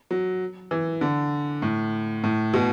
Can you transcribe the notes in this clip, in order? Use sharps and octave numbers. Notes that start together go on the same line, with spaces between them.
F#3
E3
D3
A2
A2
B2